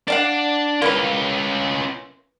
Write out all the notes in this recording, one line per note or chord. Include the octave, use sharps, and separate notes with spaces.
D4 D5 F5 F#5
A#3 C#4 E4 F4 B4